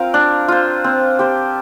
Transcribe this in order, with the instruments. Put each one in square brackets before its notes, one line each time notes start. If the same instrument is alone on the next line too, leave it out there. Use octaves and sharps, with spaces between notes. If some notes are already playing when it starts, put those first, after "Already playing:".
Already playing: [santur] C4 F4 A#4 F5
D4
F4 C5
C4
G4 C5